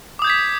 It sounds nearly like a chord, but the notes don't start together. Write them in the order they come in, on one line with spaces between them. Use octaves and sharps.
D6 D#6 G6 G#6 B6